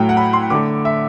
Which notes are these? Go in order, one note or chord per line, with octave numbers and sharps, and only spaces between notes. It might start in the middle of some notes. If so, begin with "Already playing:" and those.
Already playing: A2 F#3 A3 G5
F#5
B5
C6
D3 A3 D6
E5